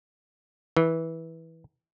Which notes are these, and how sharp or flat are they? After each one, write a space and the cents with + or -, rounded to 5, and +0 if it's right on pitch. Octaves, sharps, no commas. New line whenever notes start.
E3 -15